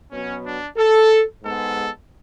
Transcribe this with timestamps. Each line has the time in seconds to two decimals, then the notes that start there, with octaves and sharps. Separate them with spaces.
0.11 B2 F#3 B3 C#4
0.44 D4
0.77 A4
1.42 G#2 G#3 B3 A4